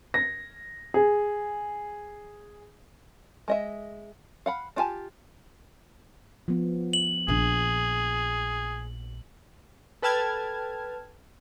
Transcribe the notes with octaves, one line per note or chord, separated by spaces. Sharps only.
A#6
G#4
G#3 D#5 E5
F5 F#5 B5
D4 F4 G4 G#5 A5
F3 B3
F#7
A#1 D4 G#4
A4 B4 G5 A5 F6 G#6